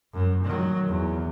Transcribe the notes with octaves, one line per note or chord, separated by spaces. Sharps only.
F#2
D#3 F#3
E2